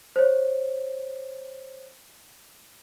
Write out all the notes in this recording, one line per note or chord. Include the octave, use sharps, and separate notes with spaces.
C5 C#5